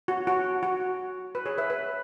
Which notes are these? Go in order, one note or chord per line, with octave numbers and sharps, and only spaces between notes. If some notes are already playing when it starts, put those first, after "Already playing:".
F#4
F#4
F#4
B4
G#4 C#5
B4 E5
B4